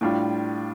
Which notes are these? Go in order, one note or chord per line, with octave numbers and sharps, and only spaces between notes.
A2 G3 D4 F4